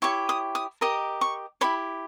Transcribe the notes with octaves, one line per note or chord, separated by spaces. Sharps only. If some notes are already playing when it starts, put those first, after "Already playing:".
E4 G4 C#5 C#6
D#6
D#6
G4 A#4 D#5 D#6
C#6
E4 G4 C#5 B5